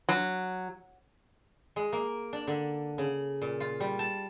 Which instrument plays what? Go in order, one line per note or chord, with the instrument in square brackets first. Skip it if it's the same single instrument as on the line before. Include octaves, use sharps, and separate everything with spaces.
[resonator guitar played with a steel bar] F#3
[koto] G#3
A#3
D4
D3
C#3
A#2
F4
G3
A5